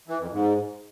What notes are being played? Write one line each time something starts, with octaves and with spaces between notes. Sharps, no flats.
E3
F2
G#2